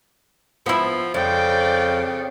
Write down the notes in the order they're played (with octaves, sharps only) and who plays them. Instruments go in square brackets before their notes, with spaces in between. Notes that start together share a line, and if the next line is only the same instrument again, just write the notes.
[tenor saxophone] F3 [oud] B3 E4
[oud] F2 [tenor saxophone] C#3 [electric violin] D5 G5